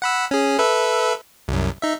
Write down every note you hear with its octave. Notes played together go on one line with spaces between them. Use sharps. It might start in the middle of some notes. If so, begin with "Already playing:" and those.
F#5 B5 E6
C#4 G#4
A4 B4 E5
C2 F#2
D#4 E5